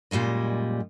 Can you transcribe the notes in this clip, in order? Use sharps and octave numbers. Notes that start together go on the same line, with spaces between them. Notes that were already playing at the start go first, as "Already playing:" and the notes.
F#2 A#2 G3 G#3 D#5